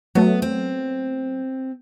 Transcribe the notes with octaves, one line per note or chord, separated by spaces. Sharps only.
F#3 A3 B3
C4